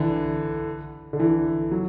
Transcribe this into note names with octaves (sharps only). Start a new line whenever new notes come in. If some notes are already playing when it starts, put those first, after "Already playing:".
Already playing: D3 E3
D3
E3
F#3